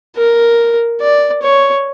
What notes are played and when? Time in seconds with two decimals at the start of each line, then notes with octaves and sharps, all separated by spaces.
0.16 A#4
1.01 D5
1.43 C#5